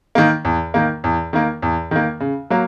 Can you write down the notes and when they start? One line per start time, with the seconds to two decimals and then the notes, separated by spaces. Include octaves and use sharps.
0.15 D#3 A#3
0.45 E2
0.74 D#3 A#3
1.04 E2
1.33 D#3 A#3
1.62 E2
1.91 D#3 A#3
2.20 C#3
2.50 F#3 A#3